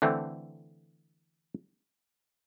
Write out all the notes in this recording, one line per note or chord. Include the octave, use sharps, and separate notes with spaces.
D3 E3 A3 C4